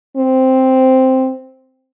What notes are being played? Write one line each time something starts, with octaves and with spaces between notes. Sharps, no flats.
C4